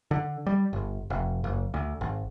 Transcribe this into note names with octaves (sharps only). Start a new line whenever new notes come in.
D3
G3
G1
F1
F#1
D2
G#1